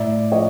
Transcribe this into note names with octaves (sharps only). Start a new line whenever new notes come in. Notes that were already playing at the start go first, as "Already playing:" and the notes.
Already playing: A2 D5 E5
F3 C#5 D#5